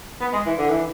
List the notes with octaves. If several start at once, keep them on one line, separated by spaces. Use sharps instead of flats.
B3
G#3
E3
D3
E3